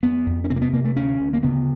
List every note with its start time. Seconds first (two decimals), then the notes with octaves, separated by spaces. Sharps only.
0.03 F2 B3
0.26 F2
0.44 C#4
0.50 C3 C4
0.56 A#3
0.62 B3
0.73 C3 A#3
0.85 A3
0.96 D2 C#4
1.20 D2
1.33 A#3
1.43 C#3 B3